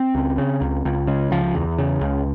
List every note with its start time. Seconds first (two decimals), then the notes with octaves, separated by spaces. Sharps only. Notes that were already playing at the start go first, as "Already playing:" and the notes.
Already playing: C4
0.15 C#2
0.38 C#3
0.61 C#2
0.85 C#2
1.07 C#3 G#3
1.31 C#2 F3
1.55 E2
1.78 C#3
2.01 C#2